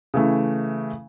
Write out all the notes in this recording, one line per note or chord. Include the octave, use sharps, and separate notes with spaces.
C#3 E3 A3